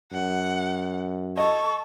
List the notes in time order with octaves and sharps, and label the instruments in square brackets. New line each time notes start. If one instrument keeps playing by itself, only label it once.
[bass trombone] F#2 [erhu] F#5
[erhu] A4 [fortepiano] D#5 [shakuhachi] C#6